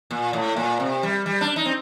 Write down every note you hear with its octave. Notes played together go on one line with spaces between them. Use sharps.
A#2
A2
A#2
C3
G3
G3
D4
D#4
C4